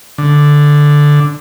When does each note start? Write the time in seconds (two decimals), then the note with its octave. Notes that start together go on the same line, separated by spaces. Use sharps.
0.18 D3